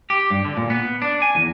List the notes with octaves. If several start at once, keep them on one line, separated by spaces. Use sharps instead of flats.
G4
G2
D3
A#2
B3
D4
G#5
E2